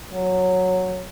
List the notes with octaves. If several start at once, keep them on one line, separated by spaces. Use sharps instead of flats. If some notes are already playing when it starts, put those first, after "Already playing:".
F#3